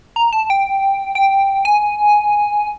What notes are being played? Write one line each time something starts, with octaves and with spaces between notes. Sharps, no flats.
A#5
A5
G5
G5
G#5